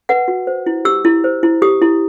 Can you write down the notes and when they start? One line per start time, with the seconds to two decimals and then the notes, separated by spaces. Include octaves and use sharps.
0.09 B4 F#5
0.28 F#4
0.47 C5
0.66 E4
0.85 G4 E6
1.05 E4
1.24 C5
1.43 E4
1.62 G4 D#6
1.82 E4